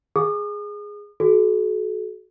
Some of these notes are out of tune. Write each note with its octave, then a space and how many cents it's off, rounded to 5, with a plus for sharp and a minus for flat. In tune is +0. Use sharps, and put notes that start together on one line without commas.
G#4 +0 D#6 -40
F#4 +0 A4 -45